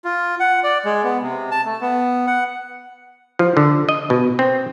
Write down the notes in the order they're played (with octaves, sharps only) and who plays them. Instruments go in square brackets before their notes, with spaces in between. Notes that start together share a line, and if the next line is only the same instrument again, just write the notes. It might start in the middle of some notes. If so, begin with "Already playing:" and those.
[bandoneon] F4
F#5
D5
G#3
B3
C3
A5
A3
B3
F#5
[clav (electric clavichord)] F3
D3
D#5
B2
C4